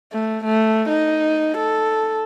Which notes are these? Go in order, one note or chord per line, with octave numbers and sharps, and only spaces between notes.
A3
A3
D#4
A4